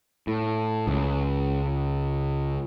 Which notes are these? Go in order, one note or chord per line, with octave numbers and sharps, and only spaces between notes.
A2
C#2